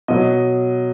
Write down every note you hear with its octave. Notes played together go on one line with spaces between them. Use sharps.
B2 F#3 D#5